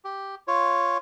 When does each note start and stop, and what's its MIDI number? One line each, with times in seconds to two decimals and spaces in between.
0.05 0.35 67
0.48 0.98 65
0.48 0.98 73